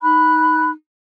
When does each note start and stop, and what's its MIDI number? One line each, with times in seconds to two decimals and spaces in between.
0.02 0.69 63
0.02 0.69 83
0.02 0.69 90